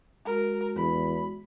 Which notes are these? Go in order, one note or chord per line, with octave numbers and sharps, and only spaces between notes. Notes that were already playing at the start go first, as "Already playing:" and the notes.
G#3 F#4 A#4
E2 B5